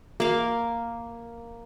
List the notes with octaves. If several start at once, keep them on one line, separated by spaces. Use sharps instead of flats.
A#3 F5